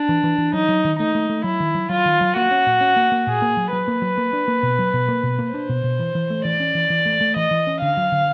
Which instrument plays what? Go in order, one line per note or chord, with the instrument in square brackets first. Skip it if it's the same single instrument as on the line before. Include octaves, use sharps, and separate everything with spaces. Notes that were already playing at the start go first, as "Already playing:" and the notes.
Already playing: [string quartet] D4
[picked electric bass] E3
E3
E3
[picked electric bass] F#3 [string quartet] D#4
[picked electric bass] F#3
D#3
[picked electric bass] A3 [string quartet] D#4
[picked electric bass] A3
A3
[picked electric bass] F#3 [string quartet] E4
[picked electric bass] D#3
F#3
[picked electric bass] F#3 [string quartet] F4
[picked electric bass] D#3
F#3
[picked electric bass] A#3 [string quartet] F#4
[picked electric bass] C#4
A#2
C#4
A#3
A#3
[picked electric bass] A#2 [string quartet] G#4
[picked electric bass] A#3
F#3
[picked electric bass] F#3 [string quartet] B4
[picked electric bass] A#3
F#3
A#3
D4
A#3
B2
F#3
B2
A#3
B2
A#3
[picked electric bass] D4 [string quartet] C5
[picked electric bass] B2
B2
E3
E3
A3
[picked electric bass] E3 [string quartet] D5
[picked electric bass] C#4
E3
E3
A3
A3
[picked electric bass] E3 [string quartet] D#5
[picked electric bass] E3
C#4
[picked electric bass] D3 [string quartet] F5
[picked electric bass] F#3
D3